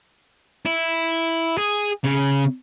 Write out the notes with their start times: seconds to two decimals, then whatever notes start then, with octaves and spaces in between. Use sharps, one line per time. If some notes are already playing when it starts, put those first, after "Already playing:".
0.66 E4
1.58 G#4
2.04 C#3